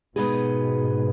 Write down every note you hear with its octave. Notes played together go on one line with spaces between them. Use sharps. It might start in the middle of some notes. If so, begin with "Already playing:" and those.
G#2 B2 G#3 B3 D#4 G#4 B4